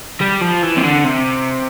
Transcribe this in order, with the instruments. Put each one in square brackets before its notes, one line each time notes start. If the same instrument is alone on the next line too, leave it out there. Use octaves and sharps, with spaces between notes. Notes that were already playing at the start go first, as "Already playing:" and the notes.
[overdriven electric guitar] G3
F3
E3
C3
D3
C3